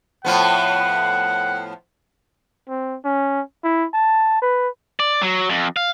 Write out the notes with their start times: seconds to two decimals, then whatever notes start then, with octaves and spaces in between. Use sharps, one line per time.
0.25 A2 F3 B3 F#5
2.69 C4
3.05 C#4
3.64 E4
3.94 A5
4.42 B4
5.00 D5
5.22 F#3
5.49 F2
5.76 F5